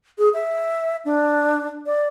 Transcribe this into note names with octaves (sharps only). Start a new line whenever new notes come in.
G#4
E5
D4
D5